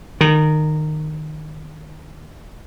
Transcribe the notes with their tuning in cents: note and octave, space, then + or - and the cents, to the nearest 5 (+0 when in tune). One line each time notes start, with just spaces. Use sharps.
D#3 -20